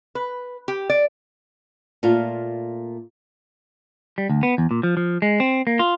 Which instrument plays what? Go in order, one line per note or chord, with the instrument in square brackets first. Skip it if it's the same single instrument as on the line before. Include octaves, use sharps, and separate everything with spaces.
[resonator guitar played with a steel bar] B4
G4
D5
[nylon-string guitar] A#2 A3 F4
[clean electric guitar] G3
D2
B3
E2
A#2
F3
F3
G#3
C4
A#3
F4